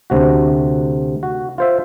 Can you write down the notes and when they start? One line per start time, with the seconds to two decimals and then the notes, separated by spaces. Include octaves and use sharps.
0.10 D2 C3 F#4
1.23 F#4
1.58 F4 C5 E5